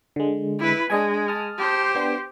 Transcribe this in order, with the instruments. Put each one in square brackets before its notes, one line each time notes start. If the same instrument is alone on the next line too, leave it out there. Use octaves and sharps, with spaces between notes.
[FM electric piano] D3 G#3
[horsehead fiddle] E4 B4
[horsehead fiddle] G#3 [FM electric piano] D4 D#5 G#5
[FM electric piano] A5 D#6 F6
[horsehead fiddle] G4 C5
[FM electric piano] B3 D4 G5